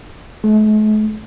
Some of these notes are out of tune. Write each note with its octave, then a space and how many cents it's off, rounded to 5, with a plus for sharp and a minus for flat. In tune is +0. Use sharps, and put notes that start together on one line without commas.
A3 -45